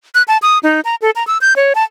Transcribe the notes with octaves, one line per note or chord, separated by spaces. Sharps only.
F#6
A5
D#6
D#4
A#5
A4
A#5
E6
G6
C#5
A5